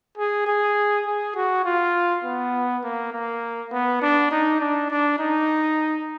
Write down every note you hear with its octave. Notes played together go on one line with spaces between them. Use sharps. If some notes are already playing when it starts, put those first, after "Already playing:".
G#4
G#4
G#4
F#4
F4
B3
A#3
A#3
B3
D4
D#4
D4
D4
D#4